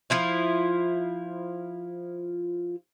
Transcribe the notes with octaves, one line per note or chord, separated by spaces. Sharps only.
F3 E4 F4